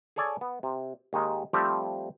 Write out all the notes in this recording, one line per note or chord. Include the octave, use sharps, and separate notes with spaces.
G#4 A4 C#5 D5 G#5
B3
C3
D#2 D#3 G#3 D#4
F3 G3 A3 C4 F4 G4